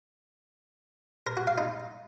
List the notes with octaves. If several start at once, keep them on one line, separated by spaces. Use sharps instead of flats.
A#4
F#4
F5
D#4